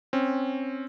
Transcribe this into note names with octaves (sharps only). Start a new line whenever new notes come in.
C4 C#4